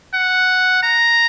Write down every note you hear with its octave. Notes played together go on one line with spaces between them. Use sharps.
F#5
A#5